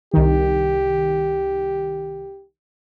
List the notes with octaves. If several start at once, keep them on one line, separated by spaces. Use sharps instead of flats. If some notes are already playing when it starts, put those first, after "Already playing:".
C2 D#3 G4